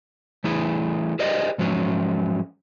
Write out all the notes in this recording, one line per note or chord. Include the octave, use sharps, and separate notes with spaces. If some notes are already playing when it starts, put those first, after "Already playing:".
E3 A3 E4 G#4
G4 G#4 A#4 C5 D5 D#5
G#2 F3 F#3 G#3 C#4